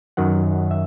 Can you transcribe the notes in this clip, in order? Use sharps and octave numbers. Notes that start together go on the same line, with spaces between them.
F#2 D#3 F#3 F#5
E5